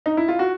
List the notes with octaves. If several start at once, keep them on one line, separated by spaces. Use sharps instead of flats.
D#4
E4
F4
F#4